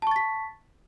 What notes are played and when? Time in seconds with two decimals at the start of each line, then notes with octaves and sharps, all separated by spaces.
0.02 A5
0.07 C#6
0.11 A6
0.16 B6